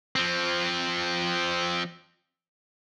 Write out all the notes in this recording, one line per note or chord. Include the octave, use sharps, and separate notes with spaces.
F3 C4